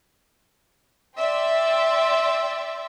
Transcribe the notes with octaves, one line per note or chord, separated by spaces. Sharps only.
D5 E5 G5 C6